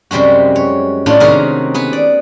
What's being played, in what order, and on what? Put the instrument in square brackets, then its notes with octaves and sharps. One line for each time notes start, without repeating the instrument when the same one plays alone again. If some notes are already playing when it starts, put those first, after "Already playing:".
[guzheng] F#2 C3 G3 G#3 F#4
C#5
A2 G#3 C#4 D4 F4
C3 D#3 C#4 F#4 G#4 A#4
B3 G#4 B4
D5